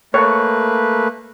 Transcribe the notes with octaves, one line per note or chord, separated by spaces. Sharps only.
A3 A#3 B4 C#5